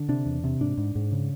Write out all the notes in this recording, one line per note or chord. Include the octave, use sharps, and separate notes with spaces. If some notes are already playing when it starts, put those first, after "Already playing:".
Already playing: D3
C3 D4
E2
C3
G#2 D4
G#2
G#2
C#3